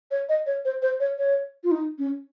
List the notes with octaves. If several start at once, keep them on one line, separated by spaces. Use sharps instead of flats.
C#5
D#5
C#5
C5
C5
C#5
C#5
F4
D#4
C#4